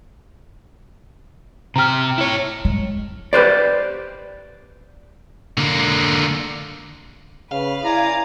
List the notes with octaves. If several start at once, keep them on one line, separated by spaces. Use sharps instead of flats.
C3 G4 A#5 F6
E4 C#5
G#3
G4 B4 C5 D5
D3 A#3
C#3 B4 F5
E4 D5 G#5 A#5